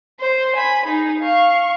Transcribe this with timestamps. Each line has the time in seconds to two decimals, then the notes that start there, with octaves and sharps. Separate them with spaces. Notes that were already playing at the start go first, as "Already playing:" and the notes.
0.20 C5
0.57 G#5 B5
0.86 D#4 G#4
1.20 F5 C#6